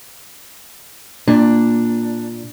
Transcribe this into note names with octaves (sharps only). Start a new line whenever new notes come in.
A#2 D4